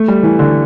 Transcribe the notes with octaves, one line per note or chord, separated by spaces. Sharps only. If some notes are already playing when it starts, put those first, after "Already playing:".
Already playing: A3
G3
E3
D3